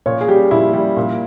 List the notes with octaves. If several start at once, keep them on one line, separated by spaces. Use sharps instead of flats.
A#2 C#5
G#4
G3 G4
A#2 E4
G3
A#2